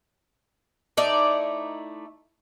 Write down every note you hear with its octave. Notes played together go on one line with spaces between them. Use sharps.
A3 D#4 E4 D5